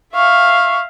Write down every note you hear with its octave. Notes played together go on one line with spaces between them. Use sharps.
E5 F5 C#6